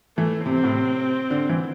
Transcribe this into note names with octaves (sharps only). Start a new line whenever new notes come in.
E3 A3
C3 C4
A2
C3
D3
E3